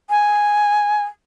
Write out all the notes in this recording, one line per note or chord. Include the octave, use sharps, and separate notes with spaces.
G#5